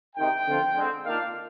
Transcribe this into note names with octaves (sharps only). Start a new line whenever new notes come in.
C3 D#3 G#3 D#4 G5
D3 F3 C4 F4
D3 G#3 C4
D#3 A#3 D4 F4 F5